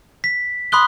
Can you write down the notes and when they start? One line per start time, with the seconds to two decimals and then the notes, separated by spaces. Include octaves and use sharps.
0.24 B6
0.72 B5 C6 D#6 F#6 G7